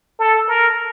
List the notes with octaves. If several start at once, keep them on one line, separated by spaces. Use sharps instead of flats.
A4
A#4